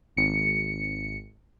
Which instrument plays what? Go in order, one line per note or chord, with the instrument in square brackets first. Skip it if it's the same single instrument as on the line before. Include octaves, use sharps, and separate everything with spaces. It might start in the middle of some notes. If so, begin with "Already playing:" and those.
[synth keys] G#1 C#7